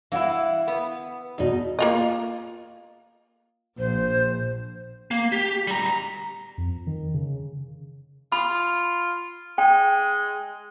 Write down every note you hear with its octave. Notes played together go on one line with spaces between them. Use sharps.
E3 E4 F5 F#5
B3
E2 B2 D#4
A#3 F4 D#5
A#1 C5
A#3
G4
G3 A#5
F2
D#3
C#3
F4 B5
G#3 G5